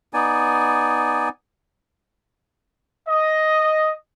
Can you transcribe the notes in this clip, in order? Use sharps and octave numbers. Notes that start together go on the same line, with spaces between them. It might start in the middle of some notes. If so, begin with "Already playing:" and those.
B3 D#4 D5 G#5
D#5